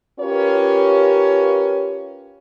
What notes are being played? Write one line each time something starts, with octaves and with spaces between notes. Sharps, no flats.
C#4 F4 G4 A#4 B4 C#5